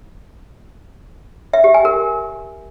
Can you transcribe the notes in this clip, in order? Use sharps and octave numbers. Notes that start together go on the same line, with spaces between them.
E5
G4
G#5
A#4